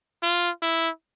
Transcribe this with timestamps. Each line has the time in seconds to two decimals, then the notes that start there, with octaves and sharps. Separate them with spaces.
0.23 F4
0.62 E4